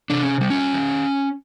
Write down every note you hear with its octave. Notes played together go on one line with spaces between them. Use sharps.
C3 D4
C#4
G3
C#4
D#3